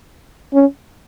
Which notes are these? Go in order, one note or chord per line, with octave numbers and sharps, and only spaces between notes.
C#4